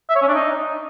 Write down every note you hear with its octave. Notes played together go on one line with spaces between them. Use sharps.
E5
C#5
C#4
D4
D#4